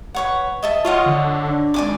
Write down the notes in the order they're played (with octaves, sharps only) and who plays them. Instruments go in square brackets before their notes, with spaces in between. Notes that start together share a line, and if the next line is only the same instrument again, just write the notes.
[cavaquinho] B4 C#5 F#5
D#5 E5 A5
[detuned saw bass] F4 [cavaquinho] C#5 D#5 F#5
[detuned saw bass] D3
[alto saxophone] D4
[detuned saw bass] G#1 [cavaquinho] D5 G#5 D6